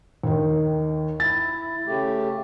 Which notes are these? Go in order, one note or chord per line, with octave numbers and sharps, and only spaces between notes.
D#2 D#3
E4 A6
C#3 A3 G4